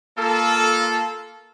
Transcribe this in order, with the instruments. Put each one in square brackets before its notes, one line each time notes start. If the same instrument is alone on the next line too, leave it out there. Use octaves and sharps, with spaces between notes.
[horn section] A#3 F4 A4